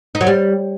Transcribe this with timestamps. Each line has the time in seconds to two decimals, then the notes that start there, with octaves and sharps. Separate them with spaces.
0.15 D#4
0.21 F#3
0.27 G3